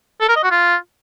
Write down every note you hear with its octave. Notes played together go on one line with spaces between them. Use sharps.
A4
A#4
D#5
F#4
F4